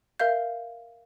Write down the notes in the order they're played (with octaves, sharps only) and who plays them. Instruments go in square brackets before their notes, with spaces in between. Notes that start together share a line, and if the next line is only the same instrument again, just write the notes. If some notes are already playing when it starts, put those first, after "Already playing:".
[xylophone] A#4 E5 F5 G6